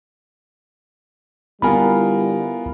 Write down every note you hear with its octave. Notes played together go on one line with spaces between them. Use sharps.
D3 G3 B3 E4 F4 A#4 G#5 B5